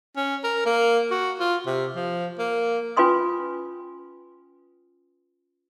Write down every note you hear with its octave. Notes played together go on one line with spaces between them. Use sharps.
C#4
A#4
A#3
F#4
F4
C3
F3
A#3
C#4 F4 B4 G#5 C6 D#6